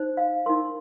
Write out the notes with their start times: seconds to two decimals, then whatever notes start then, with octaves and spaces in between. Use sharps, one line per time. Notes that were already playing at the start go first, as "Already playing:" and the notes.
Already playing: D#4 C5
0.17 F5
0.46 D#4 A#4 C6